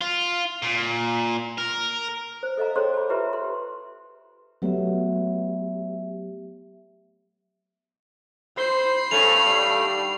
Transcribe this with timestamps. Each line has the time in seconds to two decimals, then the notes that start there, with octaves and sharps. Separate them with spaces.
0.01 F4
0.63 A#2
1.58 A#4
2.43 C5
2.57 A4 D#5 F5 A#5
2.76 G#4 A4 C5 C#5 G5 C6
2.94 A5 B5
3.09 F4 G4 B4 E5 A#5 C6
3.33 C6
4.62 F#3 A3 B3 G4 E5
8.57 C5 B5 C7
9.11 G2 A3 C#4 F7
9.45 D3 D#3 G3